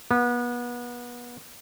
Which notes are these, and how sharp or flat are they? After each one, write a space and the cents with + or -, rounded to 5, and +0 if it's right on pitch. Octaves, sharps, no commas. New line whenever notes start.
B3 -30